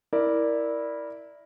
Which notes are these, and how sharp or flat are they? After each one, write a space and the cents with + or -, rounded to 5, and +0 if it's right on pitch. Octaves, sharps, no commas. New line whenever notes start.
E4 -15 A#4 +0 D5 +0